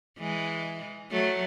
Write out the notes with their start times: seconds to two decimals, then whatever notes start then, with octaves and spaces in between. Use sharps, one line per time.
0.19 E3 G#3
1.11 F#3 A3